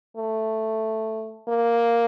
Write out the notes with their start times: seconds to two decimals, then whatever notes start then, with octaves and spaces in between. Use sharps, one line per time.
0.17 A3
1.49 A#3